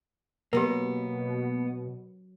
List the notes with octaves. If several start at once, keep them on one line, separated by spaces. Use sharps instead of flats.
B2 F#3 A#3 B3 G4 A#4